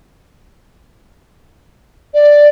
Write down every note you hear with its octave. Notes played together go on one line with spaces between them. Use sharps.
D5